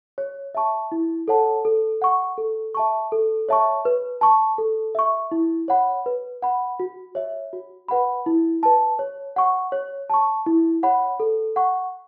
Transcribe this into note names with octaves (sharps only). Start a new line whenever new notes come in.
C#5
E5 A5 C#6
E4
A4 C#5 F#5 A5
A4
F#5 C#6
A4
E5 A5 C#6
A4
C#5 E5 A5 C#6
B4
A5 C#6
A4
E5 C#6
E4
C#5 F#5 B5
B4
F#5 B5
F#4
C#5 E5
F#4
B4 F#5 B5
E4
B4 A5
C#5
F#5 C#6
C#5
A5 C#6
E4
C#5 F#5 B5
A4
F#5 C#6